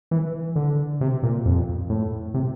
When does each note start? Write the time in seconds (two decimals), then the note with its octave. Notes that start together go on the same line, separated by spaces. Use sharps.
0.11 E3
0.56 D3
1.01 C3
1.23 A#2
1.46 F2
1.90 A2
2.34 C3